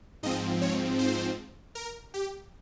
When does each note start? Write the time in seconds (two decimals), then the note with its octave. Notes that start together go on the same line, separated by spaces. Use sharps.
0.23 G#2 F3 C4 D#5
0.61 C#5
0.99 C5
1.75 A#4
2.14 G4